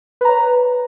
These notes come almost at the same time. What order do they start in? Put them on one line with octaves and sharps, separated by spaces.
B4 A#5 C#5